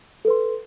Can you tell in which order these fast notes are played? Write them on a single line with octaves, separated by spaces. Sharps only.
A4 B4 C6